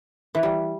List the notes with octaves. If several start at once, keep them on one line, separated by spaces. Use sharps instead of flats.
E3
G3